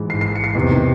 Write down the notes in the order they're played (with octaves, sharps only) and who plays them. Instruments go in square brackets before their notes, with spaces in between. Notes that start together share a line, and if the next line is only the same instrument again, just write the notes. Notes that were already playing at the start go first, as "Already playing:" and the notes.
Already playing: [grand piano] G#2 E3 G#3
C7
C7
C#7
C7
E2 C3 D#3